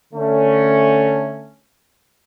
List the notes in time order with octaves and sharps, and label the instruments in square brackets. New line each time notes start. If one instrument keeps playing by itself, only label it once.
[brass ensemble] D3 A3 C#4